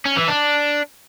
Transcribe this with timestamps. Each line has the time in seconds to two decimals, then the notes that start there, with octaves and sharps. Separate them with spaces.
0.06 C#4
0.17 E3
0.28 D4